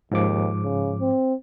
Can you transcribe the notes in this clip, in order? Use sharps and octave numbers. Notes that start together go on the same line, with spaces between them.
D#2 G#2 F3 D6
C#3
C4